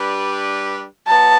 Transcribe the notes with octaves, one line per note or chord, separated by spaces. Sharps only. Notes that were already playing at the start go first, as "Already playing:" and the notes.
Already playing: G3 D4 G4 B4
F#3 B3 A5